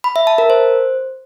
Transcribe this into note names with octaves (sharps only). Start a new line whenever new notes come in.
B5
E5
A5
A#4
C5